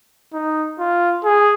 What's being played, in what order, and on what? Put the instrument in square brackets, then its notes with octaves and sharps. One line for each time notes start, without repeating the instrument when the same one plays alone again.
[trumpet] D#4
F4
G#4